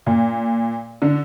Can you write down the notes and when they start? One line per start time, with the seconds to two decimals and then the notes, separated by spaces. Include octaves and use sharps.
0.06 A#2
1.02 D3